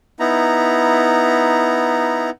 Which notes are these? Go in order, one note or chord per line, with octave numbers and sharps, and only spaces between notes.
B3 D#4 E4 A#5